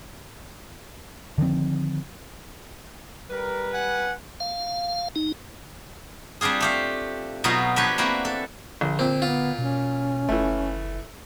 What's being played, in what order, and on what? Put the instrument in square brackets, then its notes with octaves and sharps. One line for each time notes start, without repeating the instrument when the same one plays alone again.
[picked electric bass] D3 D#3 F3 C4
[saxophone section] G3 B4 [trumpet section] A#4
[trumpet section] F#5 G#5
[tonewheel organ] F5
D#4
[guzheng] G3 C4 D4 F4 G#4
A3 G4 F5
B2 F#3 D#4 F4
F3 D4 G4 B4 C#5
A#3 C4 E4 F#4 B4
A4
[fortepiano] A#1 [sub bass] D3
[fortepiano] A#2 [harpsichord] C4
[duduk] B3 [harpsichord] F4
[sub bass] B2 [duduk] C#4
[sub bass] F#1 [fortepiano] E3 A3